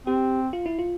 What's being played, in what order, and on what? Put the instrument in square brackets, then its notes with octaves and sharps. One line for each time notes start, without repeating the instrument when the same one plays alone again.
[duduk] C4 [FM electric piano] G4
[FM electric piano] F4
E4
F4